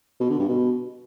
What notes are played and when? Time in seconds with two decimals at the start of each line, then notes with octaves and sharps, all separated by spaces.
0.20 B2
0.30 D3
0.39 G2
0.48 B2